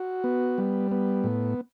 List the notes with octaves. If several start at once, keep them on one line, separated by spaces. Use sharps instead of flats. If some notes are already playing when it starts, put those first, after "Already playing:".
Already playing: F#4
B3
G3
B3
A2